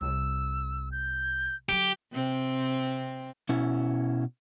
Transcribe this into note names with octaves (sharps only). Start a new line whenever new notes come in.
C2 E6
G6
D3 F#3 G4
C3 C4
B2 C#4 E4